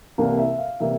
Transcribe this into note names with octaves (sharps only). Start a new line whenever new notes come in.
C2 C3 E3 G3 A#3 F5
E5
F5
C3 E3 G3 A#3 E5